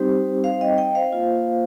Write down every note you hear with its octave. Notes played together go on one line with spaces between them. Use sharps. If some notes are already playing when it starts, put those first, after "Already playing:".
Already playing: G3 C4 D#4 G4 C5
C5 F5
D#5 G5
D#5 G5
C5 F5
A#3 F4